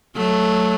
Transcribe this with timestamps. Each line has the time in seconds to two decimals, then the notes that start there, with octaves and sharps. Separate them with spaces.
0.16 F#3 A3